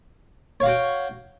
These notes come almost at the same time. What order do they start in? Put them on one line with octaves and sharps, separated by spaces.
C#5 F5 F#4 G5